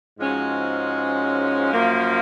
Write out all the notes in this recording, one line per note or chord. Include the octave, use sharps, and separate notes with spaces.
G#2 F3 G#3 C#4 F#4
F#2 F3 A#3